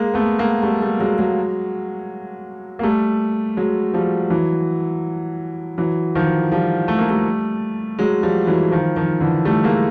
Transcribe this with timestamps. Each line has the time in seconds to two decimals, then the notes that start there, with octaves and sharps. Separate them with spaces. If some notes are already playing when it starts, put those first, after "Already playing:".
Already playing: G#3 A#3
0.14 A3 B3
0.39 G#3 A#3
0.63 G3 A3
0.82 G3 A3
1.00 F#3 G#3
1.18 F#3 G#3
2.79 A#3
2.83 G3 A3
3.57 F#3 G#3
3.94 F3 G3
4.30 E3 F#3
5.78 E3 F#3
6.15 D#3 F3
6.52 F3 G3
6.88 A3
6.99 A#3
7.09 G3 A3
7.99 F#3 G#3
8.23 F3 G3
8.47 E3 F#3
8.72 D#3 F3
8.96 D#3 F3
9.21 D3 E3
9.45 G3 A3
9.64 G#3 A#3